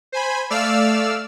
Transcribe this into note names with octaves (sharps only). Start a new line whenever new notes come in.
C5 G#5 B5
A3 D5 F5 E6 F6